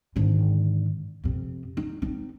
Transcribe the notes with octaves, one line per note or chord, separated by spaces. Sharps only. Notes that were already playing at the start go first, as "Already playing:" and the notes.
G#1 D3
F2 C3
D#4
C4 D#4